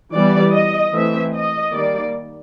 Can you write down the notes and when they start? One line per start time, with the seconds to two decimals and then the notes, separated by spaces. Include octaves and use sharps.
0.14 E3 G3 B3 D5
0.54 D#5
0.94 E3 A3 C4 E5
1.33 D#5
1.73 D#3 G3 A#3 D5